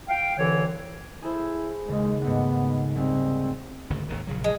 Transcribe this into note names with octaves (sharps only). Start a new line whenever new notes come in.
F5 G5
C2 D3 E3 C#5
E4 G#4 A4 C5
D#2 C#3 G#3
G#2 A3 B3 F#5
C2 G#3 C4
G#1 D2 C#3
G#1 D#2 D#3
A#1 C#3 F#3
G#3